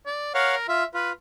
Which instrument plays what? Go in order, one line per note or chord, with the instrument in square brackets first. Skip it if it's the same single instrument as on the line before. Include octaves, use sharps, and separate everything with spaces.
[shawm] D5
[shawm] A#4 [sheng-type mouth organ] C#5 F5 F#5
[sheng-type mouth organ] F4 [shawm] E5
[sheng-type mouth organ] F4 [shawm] B4